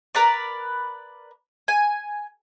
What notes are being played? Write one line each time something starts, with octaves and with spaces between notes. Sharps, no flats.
A#4 B4 D5
G#5